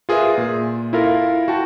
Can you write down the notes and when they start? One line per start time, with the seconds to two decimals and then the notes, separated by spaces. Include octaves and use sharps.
0.09 F4 G#4 A#4 B4 E5
0.38 A#2
0.93 E4 F4 A4 A#4 F5
1.48 F#4 G5 A5